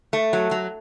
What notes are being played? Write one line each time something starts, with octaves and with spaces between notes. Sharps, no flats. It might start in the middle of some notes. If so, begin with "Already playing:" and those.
A3
F#3
F#3